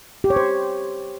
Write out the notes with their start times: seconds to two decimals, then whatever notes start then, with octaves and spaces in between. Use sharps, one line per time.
0.24 G4
0.30 C#5
0.36 C5